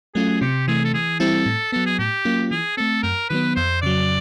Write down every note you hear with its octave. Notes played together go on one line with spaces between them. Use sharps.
F#3 A3 C#4 F4 G#4
C3 G4
E3 A3 G#4
A4
E3 G#4
G3 C4 E4 A4
A2
F#3 B3 A4
G#4
A2 G4
F#3 A#3 C#4 F4
E3 G#4
A3 C4 A4
F#2 A#4
D#3 F#3 B3 B4
F2 C5
C#3 F#3 D5